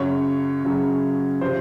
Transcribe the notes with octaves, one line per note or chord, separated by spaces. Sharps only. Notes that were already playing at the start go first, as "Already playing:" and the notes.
Already playing: F#2 C#3 F#3 C#5
F#2 C#3 F#3
C3 F3 C5